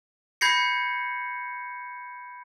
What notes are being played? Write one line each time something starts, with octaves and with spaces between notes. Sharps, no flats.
B5 G6 G#6 A#6 C7 C#7